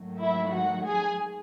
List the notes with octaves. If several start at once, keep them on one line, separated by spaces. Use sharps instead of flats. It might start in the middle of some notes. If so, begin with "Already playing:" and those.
Already playing: G#2 D#3 F#3 A3
E4 E5
F#4 F#5
G#4 G#5